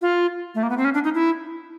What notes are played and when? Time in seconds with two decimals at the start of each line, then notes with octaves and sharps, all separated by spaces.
0.02 F4
0.55 A3
0.63 A#3
0.70 B3
0.77 C4
0.85 C#4
0.94 D4
1.04 D#4
1.14 E4